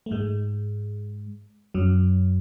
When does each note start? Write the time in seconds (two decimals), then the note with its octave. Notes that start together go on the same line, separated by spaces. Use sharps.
0.06 A3
0.11 G#2 G#3
1.74 F#2 F#3